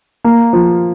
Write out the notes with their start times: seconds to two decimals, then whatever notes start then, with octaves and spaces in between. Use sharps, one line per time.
0.24 A#3
0.53 F3